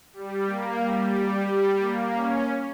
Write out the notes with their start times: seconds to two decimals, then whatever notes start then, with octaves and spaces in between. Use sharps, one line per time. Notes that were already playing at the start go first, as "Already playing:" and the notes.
0.14 G3
0.47 A#3
0.79 G3
1.13 G3
1.47 G3
1.80 A#3
2.13 C#4